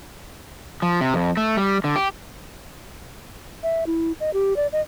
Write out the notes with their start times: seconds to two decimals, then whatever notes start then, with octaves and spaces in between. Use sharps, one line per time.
0.82 F3
1.01 C3
1.14 F2
1.37 A3
1.57 G3
1.84 D3
1.96 G4
3.63 E5
3.87 E4
4.20 D#5
4.34 G4
4.56 D5
4.72 D#5